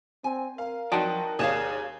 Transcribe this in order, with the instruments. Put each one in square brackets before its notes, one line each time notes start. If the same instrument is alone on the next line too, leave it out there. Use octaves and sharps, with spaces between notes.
[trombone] C4 [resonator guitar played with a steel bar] G#5
[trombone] A#4 [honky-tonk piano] F5
[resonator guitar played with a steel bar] F3 F#3 [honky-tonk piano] D#4 F#4 [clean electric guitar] D5 G5 A5
[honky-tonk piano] D#2 E7 [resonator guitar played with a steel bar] G#4 C#5 F5